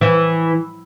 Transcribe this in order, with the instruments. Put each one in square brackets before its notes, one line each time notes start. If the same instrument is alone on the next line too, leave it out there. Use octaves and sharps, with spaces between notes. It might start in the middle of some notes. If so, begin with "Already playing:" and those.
[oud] E3